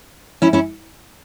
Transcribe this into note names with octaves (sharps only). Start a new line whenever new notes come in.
C#4 E4
C#4 E4